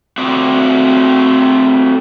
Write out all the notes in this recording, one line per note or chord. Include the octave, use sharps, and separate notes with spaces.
A3 C4 F#4 D5